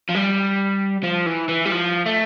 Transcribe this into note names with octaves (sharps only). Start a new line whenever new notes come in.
F3
G3
F3
E3
E3
G3
F3
A3